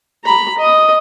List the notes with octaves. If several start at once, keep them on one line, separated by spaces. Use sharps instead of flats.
A#5 B5
D#5 D#6